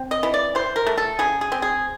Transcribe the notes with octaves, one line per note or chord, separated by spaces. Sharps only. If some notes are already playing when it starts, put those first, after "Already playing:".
Already playing: C4
D#5
E3
D5
E3 C5
A#4
A3
A4
C#3 G#4
G#4
C4
G#4